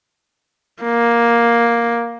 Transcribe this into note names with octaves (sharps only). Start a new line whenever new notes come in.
A#3